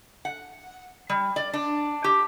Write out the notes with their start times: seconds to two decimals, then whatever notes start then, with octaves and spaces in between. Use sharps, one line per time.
0.25 F#5
1.10 G3
1.36 D5
1.53 D4
2.04 G4